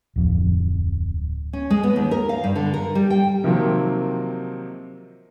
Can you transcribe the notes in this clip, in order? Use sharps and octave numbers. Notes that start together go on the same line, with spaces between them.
D1 F2
C#4
G#3
B3
D#2
A#4
F5
G2
D3
A#4
G3
G5
C3 D#3 F3 F#3 A#3 C4